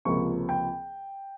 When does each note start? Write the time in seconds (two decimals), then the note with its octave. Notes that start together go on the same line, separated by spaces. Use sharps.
0.05 C#2 C3 F3 A#3 C#6
0.49 G5